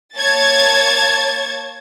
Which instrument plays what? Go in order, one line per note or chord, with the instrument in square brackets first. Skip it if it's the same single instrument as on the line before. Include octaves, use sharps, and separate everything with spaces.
[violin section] A#3 C#5 A5 G#6 A6